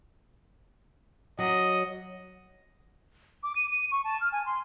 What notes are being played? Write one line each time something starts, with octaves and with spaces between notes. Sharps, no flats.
F#3 D#5
D6
D#7
D#7
C#6
A5
F6
G#5
C6